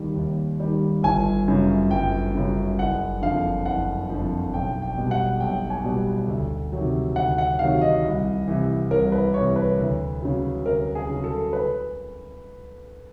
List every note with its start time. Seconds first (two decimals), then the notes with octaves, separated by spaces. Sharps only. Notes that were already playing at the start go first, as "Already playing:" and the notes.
Already playing: D#2 D#3 G3
0.16 D#2
0.60 D#3 G3
1.03 G1 G#5
1.48 F#2 C#3
1.91 G1 G5
2.35 F#2 C#3
2.79 F#1 F#5
3.22 F2 D3 F3 F5
3.66 F#1 F#5
4.10 F2 D3 F3
4.53 B1 G5
4.82 G5
4.98 B2 G3
5.11 F#5
5.40 B1 G5
5.70 G#5
5.84 B2 G3
6.28 D2
6.72 C3 D#3 F#3
7.16 D2 F#5
7.38 F#5
7.59 C3 D#3 F#3 F5
7.81 D#5
8.04 C2
8.48 C3 E3
8.91 C2 A#4
9.12 B4
9.34 C3 E3 C#5
9.56 B4
9.79 D2
10.22 C#3 F#3
10.66 D2 A#4
10.95 G#4
11.10 C#3 F#3
11.24 A4
11.53 B4